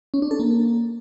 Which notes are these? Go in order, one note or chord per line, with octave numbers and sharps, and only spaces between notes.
C#4
D4
A4
A#3